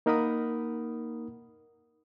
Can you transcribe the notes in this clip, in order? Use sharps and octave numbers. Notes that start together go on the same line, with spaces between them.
A#3 D#4 A#4 F#5 B5 D#6